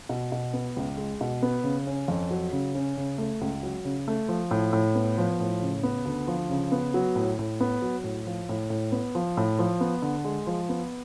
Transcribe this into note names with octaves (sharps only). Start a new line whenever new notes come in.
B2
B2
B3
C#2
G#3
B2
B3
C#3
C#4
F2
F#3
C#3
C#4
C#3
A3
C#2
F#3
C#3
A3
F3
A2
A2
B3
F3
A2
C#3
B3
D2
F3
C#3
B3
F#3
A2
A2
B3
F#3
A2
F3
A2
A2
B3
F3
A2
F3
B3
D3
G#3
F3
B3